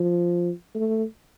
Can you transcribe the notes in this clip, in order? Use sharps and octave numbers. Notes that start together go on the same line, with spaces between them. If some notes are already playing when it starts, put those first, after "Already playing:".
Already playing: F3
A3